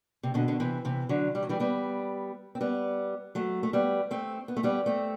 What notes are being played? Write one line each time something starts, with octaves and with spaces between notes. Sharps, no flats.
C3
B2 D3
D3
C3 E3
C3 E3
D3 F#3
G3
F#3
E3 G3
G3 B3
C4
G3 B3
F#3 A3
A3
G3 B3
A3 C4
B3
A3
G3 B3
A3 C4